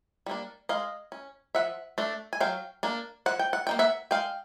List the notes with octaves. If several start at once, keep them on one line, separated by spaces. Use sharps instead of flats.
G3 A#3 D4
G#3 D#5 F5
C#4
F3 E5 F#5
A3 D4
G#5
F#3 F5 G5
A#3 D4
F3 F#5
G5
F#5
A#3 D#4 G5
E5 F#5
G#3 F5 G5